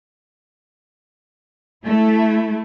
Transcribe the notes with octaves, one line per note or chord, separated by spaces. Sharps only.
A3 E4